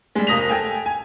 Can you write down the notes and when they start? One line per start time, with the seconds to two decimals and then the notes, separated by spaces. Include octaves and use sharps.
0.15 G3 G#3
0.27 F1 A#3 D#6 A#6 B6 F7
0.49 A4 G5 G#5
0.86 G#5